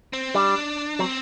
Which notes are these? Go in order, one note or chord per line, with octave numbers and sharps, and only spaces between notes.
C4
G3 D4
F#3 C4